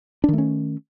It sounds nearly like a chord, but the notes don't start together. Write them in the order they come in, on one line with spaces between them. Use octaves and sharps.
D4 D#3 A3 C#4